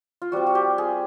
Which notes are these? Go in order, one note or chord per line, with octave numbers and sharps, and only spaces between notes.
F4
G3 C4 F4 F#4
F#4
G4
G#4